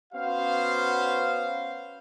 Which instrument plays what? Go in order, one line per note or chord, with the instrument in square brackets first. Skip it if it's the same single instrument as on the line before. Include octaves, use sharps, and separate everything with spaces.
[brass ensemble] B3 C#4 F#4 C5 F5